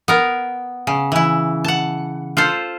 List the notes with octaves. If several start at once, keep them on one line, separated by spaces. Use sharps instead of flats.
B3 A#4
C#3
E3 E4
F#5 A5
F4 A4 C5